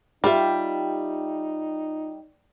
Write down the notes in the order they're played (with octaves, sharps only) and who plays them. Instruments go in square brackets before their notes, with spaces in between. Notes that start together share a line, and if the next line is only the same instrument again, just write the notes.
[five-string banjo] G3 [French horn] D#4 [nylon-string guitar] F4 G4 E5